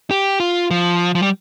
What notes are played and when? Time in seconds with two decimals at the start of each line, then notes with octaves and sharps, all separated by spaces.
0.11 G4
0.40 F4
0.71 F3
1.15 F3
1.22 G3